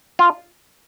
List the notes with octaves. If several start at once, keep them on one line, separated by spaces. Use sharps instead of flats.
F4